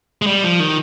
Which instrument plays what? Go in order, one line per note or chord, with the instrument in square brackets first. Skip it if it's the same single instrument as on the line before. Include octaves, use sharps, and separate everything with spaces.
[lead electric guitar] G#3
G3
F3
D#3